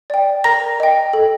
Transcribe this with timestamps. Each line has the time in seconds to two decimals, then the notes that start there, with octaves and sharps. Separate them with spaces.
0.10 D5 G5
0.44 A#4 A#5 A#6
0.80 D#5 G5
1.13 A4